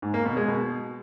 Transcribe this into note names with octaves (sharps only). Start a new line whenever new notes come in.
G#2
A#3
B2
G#3
B2